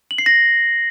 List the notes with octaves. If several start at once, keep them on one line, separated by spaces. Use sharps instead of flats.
F#7
C7
A#6